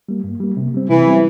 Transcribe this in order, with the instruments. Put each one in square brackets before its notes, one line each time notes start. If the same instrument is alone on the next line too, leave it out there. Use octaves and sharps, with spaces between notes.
[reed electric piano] G3 A#3
G2
G3 A#3
C3
G3 C4
[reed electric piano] C3 [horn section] E3
[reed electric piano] G3 C4